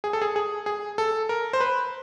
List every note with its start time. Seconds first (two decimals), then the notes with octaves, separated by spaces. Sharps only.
0.04 G#4
0.13 A4
0.22 G#4
0.36 G#4
0.66 G#4
0.98 A4
1.29 A#4
1.53 C5
1.60 B4